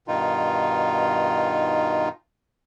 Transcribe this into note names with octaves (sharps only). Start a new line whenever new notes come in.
G2 B2 D#3 D#4 F4